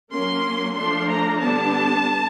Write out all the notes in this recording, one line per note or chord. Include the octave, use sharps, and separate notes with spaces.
F#3 A#3 C#4 C6
F3 A3 D4 C6
A#5
D3 G3 B3 D4 A5